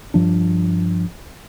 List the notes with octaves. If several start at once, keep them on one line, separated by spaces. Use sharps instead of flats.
G2 F3 D4